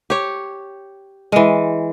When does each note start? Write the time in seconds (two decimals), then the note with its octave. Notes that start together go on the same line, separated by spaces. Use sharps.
0.10 G4 C#5
1.32 E3 G#3